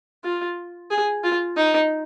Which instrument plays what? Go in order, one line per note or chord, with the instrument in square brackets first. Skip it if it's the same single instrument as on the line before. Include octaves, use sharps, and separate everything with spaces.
[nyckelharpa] F4
G#4
F4
D#4